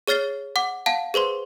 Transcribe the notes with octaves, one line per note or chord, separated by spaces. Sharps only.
G#4 C#5 F6 A6 C7 G7
F#5 D6
F5 F#5 A5
G#4 B4 C5 C6